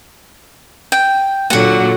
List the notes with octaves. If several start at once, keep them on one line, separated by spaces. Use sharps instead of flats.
G5
A#2 D3 F#3 F#4 F#5